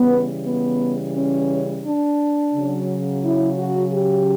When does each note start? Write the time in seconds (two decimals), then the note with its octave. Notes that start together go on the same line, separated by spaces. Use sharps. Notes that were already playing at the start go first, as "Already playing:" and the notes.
Already playing: C#3 E3 G3 B3
0.46 B3
1.15 C#4
1.85 D4
2.54 C#3
2.59 F#3
3.24 E4
3.58 F#4
3.93 G4